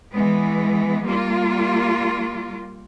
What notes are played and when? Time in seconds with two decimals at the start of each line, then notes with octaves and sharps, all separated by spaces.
0.14 E3 G#3 B3
1.06 G3 A#3 F4